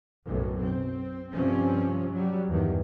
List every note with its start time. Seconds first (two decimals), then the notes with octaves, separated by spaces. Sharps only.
0.27 B1 F#2 A2
0.63 C4
1.33 G2 C3 F3 G3 C4 C#4
2.11 F#3 G3
2.48 E2 G2 D#3